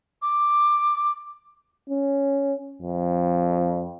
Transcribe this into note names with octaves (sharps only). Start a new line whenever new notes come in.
D6
C#4
F2